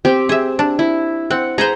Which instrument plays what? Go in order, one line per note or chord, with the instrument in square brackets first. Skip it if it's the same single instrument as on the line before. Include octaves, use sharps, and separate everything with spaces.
[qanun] C4 G4
[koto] G#4 E5
D4
[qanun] E4
[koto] C4 [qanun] F#5
[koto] G#4 B4 C5 [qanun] A#5